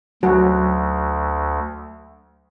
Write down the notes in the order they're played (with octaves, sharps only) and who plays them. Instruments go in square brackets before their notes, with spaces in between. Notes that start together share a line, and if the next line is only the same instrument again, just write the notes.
[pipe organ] D2 [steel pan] F#3 F#4